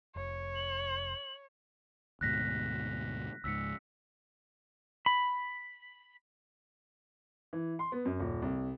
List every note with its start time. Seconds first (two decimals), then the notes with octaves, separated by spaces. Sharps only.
0.16 F1 C#5
0.56 F#7
2.21 D2 G#2 B2 F#6 A#6 B6
3.44 C#2 G#2 E6 B6 C#7
5.06 B5
7.53 E3
7.79 C6
7.92 B3
8.05 F#2
8.19 D#1
8.42 C2